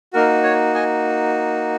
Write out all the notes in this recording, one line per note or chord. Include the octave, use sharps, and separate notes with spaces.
A#3 D#4 F#4 A#4
C#5
D#5 G#5